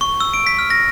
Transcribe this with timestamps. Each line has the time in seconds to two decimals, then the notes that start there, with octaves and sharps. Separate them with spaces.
0.01 C#6
0.20 E6
0.34 D7
0.47 B6
0.59 F6
0.70 A#6